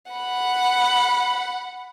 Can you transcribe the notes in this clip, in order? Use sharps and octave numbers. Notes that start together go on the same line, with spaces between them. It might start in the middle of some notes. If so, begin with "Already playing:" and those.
F#5 B5